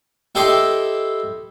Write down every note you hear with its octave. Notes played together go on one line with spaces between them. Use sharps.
E4 G4 A4 D#5 C6 D6